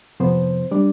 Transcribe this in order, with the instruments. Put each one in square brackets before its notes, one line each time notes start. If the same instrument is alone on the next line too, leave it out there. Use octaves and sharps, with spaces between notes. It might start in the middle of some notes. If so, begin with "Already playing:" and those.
[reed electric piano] F2 C3 F3 B3 C5
G3 D4 D5